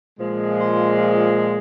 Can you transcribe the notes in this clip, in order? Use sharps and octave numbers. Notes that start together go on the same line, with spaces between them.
A#2 F3 G#3
C5